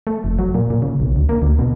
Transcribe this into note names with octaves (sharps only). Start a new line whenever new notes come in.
A3
F1
F#3
A#2
A#2
C#3
B1
D2
A#3
D2
B2